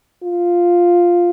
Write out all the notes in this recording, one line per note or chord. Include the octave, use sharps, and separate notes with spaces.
F4